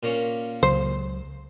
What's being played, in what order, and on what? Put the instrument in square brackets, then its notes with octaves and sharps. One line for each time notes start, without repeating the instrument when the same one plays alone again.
[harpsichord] A#2 A#3 C#4
[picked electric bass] C#2 C#3 F#3 [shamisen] C5